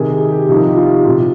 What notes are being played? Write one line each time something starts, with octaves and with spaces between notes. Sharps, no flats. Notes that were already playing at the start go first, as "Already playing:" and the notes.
Already playing: C3 D#3 G#4
G#4
G4
C3 F3 D#4
G4
F4
C3 F3 F4